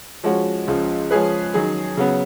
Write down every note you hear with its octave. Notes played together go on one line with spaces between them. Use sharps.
F3 G#3 C#4 F#4
C#2 C#3 F3
F3 G#3 C#4 G#4 B4
D#3 F#3 C#4 G#4
C#3 F#3 B3